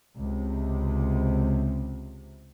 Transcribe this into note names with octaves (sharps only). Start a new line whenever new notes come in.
C#2 C3